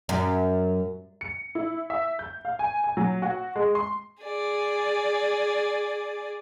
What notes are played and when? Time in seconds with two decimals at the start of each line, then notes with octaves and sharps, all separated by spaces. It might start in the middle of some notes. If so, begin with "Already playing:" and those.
0.09 F#2
1.21 C#7
1.55 E4
1.90 E5
2.19 G6
2.45 F5
2.59 G#5
2.84 G#5
2.97 F#3
3.22 F#4
3.56 G#3
3.75 C6
4.24 G#4 D5